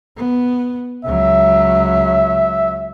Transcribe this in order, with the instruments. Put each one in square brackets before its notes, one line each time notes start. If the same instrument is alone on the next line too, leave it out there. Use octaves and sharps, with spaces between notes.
[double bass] B3
[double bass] C#2 F#3 [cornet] E5